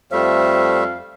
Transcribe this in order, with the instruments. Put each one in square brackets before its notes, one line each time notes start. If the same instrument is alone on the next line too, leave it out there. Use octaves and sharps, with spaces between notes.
[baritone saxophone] F2 [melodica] G3 A3 E5 [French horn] C5 [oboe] F5